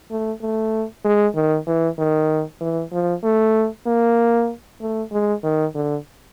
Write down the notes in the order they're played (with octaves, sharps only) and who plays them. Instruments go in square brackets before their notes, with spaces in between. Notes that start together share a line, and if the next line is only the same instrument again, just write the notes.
[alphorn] A3
A3
G#3
D#3
E3
D#3
E3
F3
A3
A#3
A3
G#3
D#3
D3